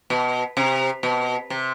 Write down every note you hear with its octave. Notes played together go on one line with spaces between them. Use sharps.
B2
C3
B2
C3